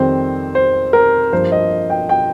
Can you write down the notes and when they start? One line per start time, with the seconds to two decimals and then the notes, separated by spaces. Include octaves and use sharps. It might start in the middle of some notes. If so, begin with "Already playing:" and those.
Already playing: F2 D#3 G3 C4 C5
0.55 C5
0.93 A#4
1.32 G2 F3 A#3 C5
1.52 D#5
1.90 G5
2.09 G5